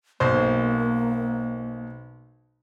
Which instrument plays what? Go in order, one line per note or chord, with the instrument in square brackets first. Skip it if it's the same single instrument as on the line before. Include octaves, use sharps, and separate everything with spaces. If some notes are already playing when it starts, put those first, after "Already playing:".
[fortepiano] B1 C5 [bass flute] A#3